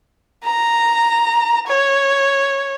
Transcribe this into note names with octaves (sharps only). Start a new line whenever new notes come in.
A#5
C#5